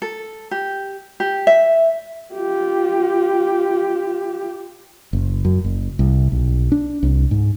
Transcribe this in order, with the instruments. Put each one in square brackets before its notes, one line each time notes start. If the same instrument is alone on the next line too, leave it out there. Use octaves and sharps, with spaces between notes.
[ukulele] A4
G4
G4
E5
[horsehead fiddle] F4 G4
[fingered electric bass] F#1
F#2
F#1
C2
B1
D4
C2
G#2